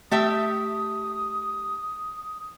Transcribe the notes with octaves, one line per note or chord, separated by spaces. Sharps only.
A3 G4 E5 D#6